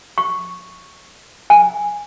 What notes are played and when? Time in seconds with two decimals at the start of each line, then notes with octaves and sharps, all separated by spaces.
0.18 C#6
1.50 G#5